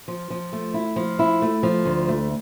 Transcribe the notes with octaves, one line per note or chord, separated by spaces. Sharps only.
F3
F3
A3
E4
F3
E4
A3
F3
D2
A3